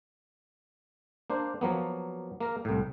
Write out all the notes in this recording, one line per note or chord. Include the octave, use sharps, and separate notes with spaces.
A#3 D4 C5
F3 F#3 A#3 B3
A#3 A#4
C2 A2